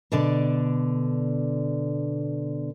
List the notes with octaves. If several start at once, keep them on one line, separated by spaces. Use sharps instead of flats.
B2 D3 D4 D5